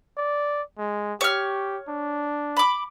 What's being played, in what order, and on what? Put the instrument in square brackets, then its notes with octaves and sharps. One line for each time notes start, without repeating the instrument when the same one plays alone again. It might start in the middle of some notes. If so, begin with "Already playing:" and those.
[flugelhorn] D5
G#3
[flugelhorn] G4 [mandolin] C#5 F6
[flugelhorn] D4
[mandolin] B5 D6